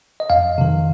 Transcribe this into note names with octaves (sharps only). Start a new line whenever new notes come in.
D#5
F2 F5
C3 D#3